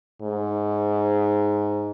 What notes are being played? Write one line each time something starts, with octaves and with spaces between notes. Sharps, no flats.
G#2